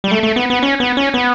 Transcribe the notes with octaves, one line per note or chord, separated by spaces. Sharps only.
G3
A3
A3
B3
B3
C#4
B3
C#4
B3